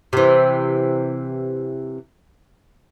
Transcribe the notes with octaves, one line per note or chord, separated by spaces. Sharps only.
C3 E3